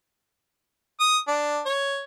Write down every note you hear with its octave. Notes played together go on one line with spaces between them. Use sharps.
D#6
D4
C#5